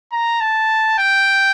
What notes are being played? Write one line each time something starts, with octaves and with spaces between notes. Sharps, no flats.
A#5
A5
G5